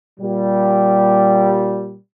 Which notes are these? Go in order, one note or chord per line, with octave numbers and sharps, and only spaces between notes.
A#2 G3